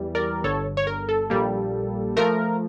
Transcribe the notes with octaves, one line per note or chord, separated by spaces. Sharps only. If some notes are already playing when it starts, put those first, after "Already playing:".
Already playing: E2 E3 G3
A#4 D5
G1 G2 D3 A4 C#5
C#5
A#4
A4
A#1 A#2 G3 A#3
F3 A3 A#4